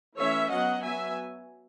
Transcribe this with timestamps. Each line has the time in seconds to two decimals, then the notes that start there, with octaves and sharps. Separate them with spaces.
0.18 E3 A3 C#4 C#5 E5
0.50 F#3 B3 D#5 F#5
0.84 F#3 B3 E5 G#5